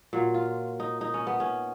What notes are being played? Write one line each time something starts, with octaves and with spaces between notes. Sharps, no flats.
A#2 F#3
F4
D#4
D#4
C#4
B3
C#4